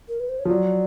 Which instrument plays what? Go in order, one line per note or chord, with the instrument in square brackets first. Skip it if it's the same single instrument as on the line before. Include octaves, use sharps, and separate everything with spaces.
[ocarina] A#4
B4
C5
C#5
[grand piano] F3
[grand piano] F#3 [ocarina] D5